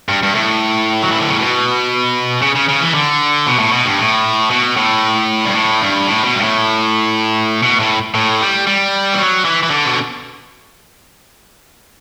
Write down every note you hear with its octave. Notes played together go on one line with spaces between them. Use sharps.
G2
G2
A2
F#3
E3
D3
C#3
B2
C#3
C#3
C#3
E3
D3
B2
A2
B2
G2
A2
B2
A2
G2
A2
G2
A2
B2
G2
A2
B2
A2
A2
G3
G3
E3
F#3
E3
E3
D3
B2